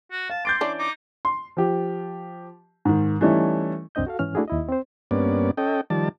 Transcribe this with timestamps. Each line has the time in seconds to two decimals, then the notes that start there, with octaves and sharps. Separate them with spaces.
0.11 F#4
0.30 F5 A5
0.45 C6 D6 G6 A6 D7
0.61 E3 C#4 D4 D6
0.79 D#4 D6
1.25 C6
1.57 F3 G4
2.85 G#2 D#3
3.21 E3 G3 A3 C#4 D#4
3.95 C2 F#2 C4 D4 D#5 G6
4.07 F#4 A4 F5
4.19 G#2 E3 C#4 F6
4.35 A3 D4 E4 F#4 G#4
4.48 D#2 E4 D#5
4.69 C4 C5
5.11 G2 A#3 B3 C#4 D5
5.57 C#4 A4 D#5 G5
5.90 D#3 F3 G3 D5 A5